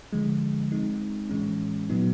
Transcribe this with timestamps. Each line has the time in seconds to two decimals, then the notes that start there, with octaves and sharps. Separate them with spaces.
0.13 D3 F3 G#3
0.72 G#3 C4 D#4
1.29 A2 E3 G#3 C#4
1.89 A#2 F#3 B3 D#4